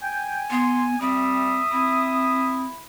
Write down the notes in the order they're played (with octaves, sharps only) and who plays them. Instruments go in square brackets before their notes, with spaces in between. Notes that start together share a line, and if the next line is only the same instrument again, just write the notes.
[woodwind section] G5 [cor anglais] G#5
[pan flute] B3 [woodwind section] C6
[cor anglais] G3 [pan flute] C4 [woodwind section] E5 D#6
[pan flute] C4 [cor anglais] E4